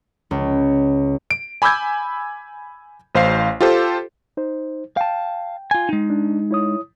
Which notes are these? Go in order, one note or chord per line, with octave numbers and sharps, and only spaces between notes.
C#2
D7
G#5 B5 D6 E6 G6 G#6
A1 C5 F5 C7
F4 G4 A4 C5
D#4 C5
F5 G5 A5
F4 G#5
G#3 D#4
D4
E4 C#5 D#6